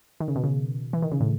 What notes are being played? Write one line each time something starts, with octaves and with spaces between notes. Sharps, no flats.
D#3
C#3
B2
C#3
E3
D#3
C#3
A2